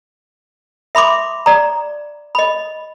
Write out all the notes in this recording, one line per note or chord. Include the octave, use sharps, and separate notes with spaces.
E5 B5 C6 D6
D5 A#5
D#5 B5